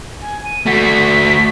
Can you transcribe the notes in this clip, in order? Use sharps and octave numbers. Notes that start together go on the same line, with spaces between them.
G#5
D#7
A3 F#4 B6